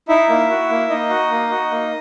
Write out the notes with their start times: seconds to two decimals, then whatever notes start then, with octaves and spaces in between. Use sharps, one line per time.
0.09 D#4 E4 E5
0.29 A#3
0.49 F#4
0.70 A#3
0.89 A#3 D#4 D#5
1.10 F#4
1.31 A#3
1.51 F#4
1.71 A#3